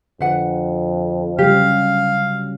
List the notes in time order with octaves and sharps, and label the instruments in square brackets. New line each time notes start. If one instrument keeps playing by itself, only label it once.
[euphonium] F2 [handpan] D3 [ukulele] B4 F#5
[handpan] C#3 F#3 G3 [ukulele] G4 [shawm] F5